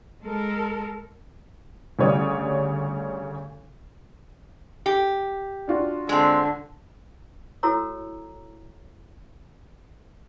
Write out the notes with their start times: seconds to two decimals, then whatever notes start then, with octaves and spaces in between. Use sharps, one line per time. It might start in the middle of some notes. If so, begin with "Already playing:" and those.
0.22 G#3 A4 A#4
1.99 D2 C#3 G3 C#5 D5 D#6
4.86 G4
5.68 D4 F4 F#4
6.09 D3 G#3 C4
7.63 E4 F#4 A4 C#5 A#5 E6